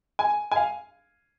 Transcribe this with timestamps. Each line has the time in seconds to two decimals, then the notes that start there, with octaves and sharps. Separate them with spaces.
0.19 G#5
0.52 G#5
0.56 F5